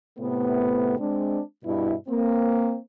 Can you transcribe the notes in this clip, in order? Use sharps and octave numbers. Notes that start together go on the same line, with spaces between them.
A2 C3 A3 B3
G#3 C4 D4
G2 B2 E4
A#3 C4